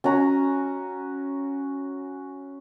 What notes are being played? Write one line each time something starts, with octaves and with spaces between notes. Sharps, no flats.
C#4 F#4 A#5